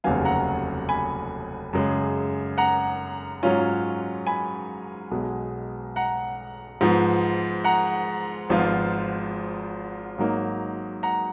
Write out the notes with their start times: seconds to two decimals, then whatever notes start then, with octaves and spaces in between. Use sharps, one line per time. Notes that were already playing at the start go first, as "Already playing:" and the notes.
0.04 F1 D#2 C#3 F#3 B3 F5 G#5
0.25 F#5 A#5
0.89 G#5 B5
1.73 F#2 C#3 G#3
2.58 F#5 A#5
3.43 G#2 F#3 C#4 F4
4.27 G#5 B5
5.11 B1 B2 G#3
5.96 F#5 A#5
6.81 G#2 F3 B3
7.64 F#5 A#5
8.49 G#1 G#2 F3 B3 F4
10.18 G#2 F#3 A#3 D#4
11.03 F#5 A#5